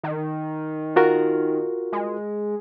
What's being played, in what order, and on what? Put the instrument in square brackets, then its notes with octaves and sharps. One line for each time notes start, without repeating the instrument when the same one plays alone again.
[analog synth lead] D#3
[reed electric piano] F4 F#4 A#4
[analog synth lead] G#3